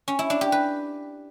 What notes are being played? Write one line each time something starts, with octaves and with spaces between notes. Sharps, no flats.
C#4
E4
D4
G4
B4